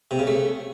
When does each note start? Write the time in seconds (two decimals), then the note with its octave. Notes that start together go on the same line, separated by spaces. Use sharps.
0.11 C3
0.19 C#3
0.27 A3